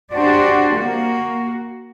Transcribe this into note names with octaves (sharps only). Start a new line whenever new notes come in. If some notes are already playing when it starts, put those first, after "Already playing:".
D4 F#4 G4 C5 D5
A#3 F#4